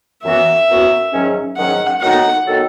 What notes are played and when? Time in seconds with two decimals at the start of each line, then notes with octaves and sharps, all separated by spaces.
0.23 F#2 E3 B3 F#4 E5
0.68 F#2 E3 B3 F#4
1.12 G#2 D#3 F#3 C#4
1.57 G#2 D#3 F#3 C#4 F#5
2.01 D#3 F#3 B3 D#4 A4 F#5
2.46 D#3 F#3 B3 D#4 A4